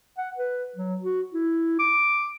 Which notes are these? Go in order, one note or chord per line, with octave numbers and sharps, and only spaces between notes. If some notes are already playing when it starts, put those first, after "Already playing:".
F#5
B4
F#3
F#4
E4
D6